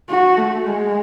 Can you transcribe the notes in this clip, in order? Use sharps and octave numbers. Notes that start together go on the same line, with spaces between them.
F#4
A3
G#3